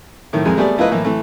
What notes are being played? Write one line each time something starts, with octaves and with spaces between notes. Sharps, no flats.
A2 D#3
F2 G#3 A#4 G#5
G3 A3 B3 G4 G#4 D5
A3 E4 F4 A#4 B4 D#5
A2 E3 A#3
E3 A3